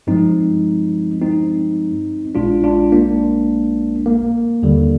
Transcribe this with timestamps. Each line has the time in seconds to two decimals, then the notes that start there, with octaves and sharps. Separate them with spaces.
0.07 G2 F3 G#3 C4 D#4
1.21 C4 D#4
2.35 A#1 A#2 G#3 D4 F4
2.64 D4 F4
2.92 A#3 D4
4.06 A#3
4.63 D#2 D3 G3